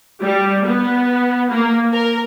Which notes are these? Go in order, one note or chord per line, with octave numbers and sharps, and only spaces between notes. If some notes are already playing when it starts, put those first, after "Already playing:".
G3
B3
A#3
A#4